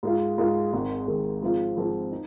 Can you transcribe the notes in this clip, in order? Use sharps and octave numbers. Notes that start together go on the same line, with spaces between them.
G#2 G#3 F4
G#2 G#3 F4
G#1 G#2 D#3 G#3
G#1 G#2 D#3 G#3
G#2 F3 C4 F4
G#2 F3 C4 F4
D#4